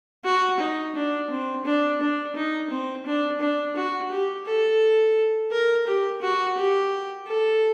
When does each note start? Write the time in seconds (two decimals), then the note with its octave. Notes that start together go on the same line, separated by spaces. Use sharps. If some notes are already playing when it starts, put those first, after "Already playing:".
0.25 F#4
0.59 D#4
0.95 D4
1.30 C4
1.65 D4
2.01 D4
2.35 D#4
2.70 C4
3.06 D4
3.41 D4
3.76 F#4
4.11 G4
4.46 A4
5.51 A#4
5.87 G4
6.22 F#4
6.57 G4
7.27 A4